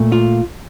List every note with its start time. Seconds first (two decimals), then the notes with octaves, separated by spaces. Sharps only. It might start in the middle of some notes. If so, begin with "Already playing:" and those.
Already playing: A#2 A3
0.12 F4